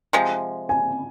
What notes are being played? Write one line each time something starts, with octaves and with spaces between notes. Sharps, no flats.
C3 F3 G#3
G#5